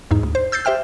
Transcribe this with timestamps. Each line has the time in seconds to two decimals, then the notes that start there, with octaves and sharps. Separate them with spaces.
0.11 E2 G#2 D#4
0.23 D2
0.35 C5
0.52 E6 G6 A6 C7
0.65 G4 C5 E5 G5 F6